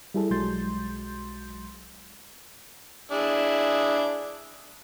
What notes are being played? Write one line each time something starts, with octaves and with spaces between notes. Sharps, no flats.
G3 E4 G#4 A4
B1 F#3 G#3 C6 G6 A6
D4 E4 G#4